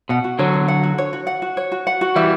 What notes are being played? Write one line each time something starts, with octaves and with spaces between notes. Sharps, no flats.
B2 F#5
F#4
D3 F#3 C#5
F#4
F#5
F#4
C#5
F#4
F#5
F#4
C#5
F#4
F#5
F#4
E3 G3 E5